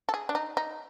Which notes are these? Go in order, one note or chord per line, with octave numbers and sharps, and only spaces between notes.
A4
G#4
D4
D#4
D#4